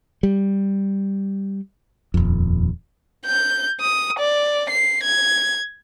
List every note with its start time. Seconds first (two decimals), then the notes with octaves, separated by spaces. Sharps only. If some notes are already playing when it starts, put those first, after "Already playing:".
0.23 G3
2.14 D#1 F2
3.26 G6
3.81 D#6
4.19 D5
4.70 C7
5.03 G#6